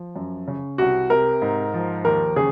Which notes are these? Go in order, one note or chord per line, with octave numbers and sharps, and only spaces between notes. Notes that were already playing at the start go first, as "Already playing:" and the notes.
Already playing: F3
F#2
C#3
C2 F#4
C3 A#4
G#2
F3
D#2 A#4
C#3 G#4